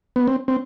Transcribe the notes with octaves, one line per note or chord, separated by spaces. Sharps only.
B3
C4
C4